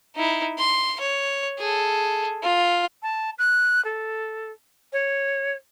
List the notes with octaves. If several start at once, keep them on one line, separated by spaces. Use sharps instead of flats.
D#4 E4
C6
C#5
G#4 A4
F4
A5
F#6
A4
C#5